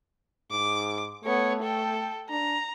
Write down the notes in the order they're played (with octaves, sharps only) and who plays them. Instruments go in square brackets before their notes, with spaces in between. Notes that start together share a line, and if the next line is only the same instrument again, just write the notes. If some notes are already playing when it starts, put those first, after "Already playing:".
[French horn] G#2 [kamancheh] D6
[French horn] A3 [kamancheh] B3 C#5
[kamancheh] A4 G5
[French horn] D4 [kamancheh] A#5